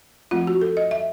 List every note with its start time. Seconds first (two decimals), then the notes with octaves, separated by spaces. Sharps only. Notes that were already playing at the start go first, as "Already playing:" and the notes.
0.31 F3 A3 C4 F4
0.47 F#4
0.61 A4
0.77 D#5
0.91 E5